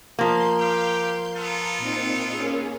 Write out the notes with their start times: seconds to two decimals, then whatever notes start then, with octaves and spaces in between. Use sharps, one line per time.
0.19 F3 A#3 C6 G6
0.57 G4 F5 G5
1.35 B3 F4 A4 A5 A#5
1.78 A#2 C4 D#4
2.30 A#3 C#4 G#4